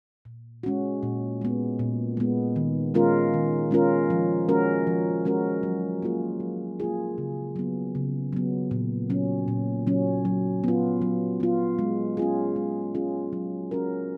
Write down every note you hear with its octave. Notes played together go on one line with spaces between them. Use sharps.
A#2
G#3 C#4 F#4
A#2
G#3 B3
A#2
G#3 B3
D#3
G#3 C#4 F4 A#4
D#3
G#3 C#4 F4 A#4
F3
G#3 C#4 F#4 A#4
F3
G#3 C#4 F#4 A#4
F#3
A#3 F4 G#4
F#3
A#3 F4 G#4
C#3
F#3 B3
C#3
F#3 B3
A#2
F#3 C#4
A#2
F#3 C#4
F#3
B3 F4
F#3
B3 F4
G#3
C#4 F4 G#4
G#3
C#4 F4 G#4
F#3
C#4 F#4 A#4